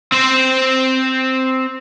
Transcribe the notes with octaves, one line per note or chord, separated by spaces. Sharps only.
C4 C5